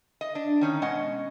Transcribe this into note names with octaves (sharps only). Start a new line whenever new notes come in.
D#5
D4
D#3 C#4 D#4
B2 G#3 C#4 D#5 F#5